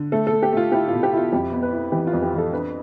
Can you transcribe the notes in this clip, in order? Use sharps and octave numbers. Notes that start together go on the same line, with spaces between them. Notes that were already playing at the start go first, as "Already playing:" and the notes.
Already playing: D3
A3 A4
A4
A3
G4
A3 F4
E4 G4
B2 F4
G4
E4 F4
F2 G4
B3
B4
E4
E3 G4
F4
F2
G4
E3
A4
D4 B4